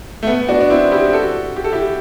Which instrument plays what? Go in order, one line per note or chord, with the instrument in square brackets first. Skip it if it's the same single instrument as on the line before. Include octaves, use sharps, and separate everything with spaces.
[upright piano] A3
B3
D4 F#4
D4
C4 E4
E4 G4
F#4 A4
G4
A4
E4 G4